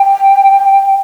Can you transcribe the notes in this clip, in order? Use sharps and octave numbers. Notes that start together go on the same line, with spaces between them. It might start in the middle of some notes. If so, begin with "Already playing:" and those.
Already playing: G5